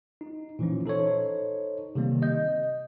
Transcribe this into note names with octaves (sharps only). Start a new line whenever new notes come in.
D#4
A#2 E3 F3 C#4
D#4 A4 C5 C#5
C3 D#3 G3 A#3 C4
D#5 G6